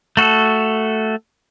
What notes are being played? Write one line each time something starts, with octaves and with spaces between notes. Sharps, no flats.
A3 F#4 A4